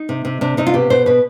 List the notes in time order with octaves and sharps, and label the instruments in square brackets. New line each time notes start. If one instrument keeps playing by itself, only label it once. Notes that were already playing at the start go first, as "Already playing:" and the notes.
Already playing: [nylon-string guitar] D#4
C3
C3
C3 D4
C3 D#4
F4
B2 G4
B2 C5
B2 B4